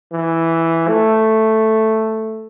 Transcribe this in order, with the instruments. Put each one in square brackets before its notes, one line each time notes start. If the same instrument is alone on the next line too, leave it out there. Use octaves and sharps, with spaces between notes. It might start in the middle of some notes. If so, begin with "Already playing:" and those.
[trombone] E3
A3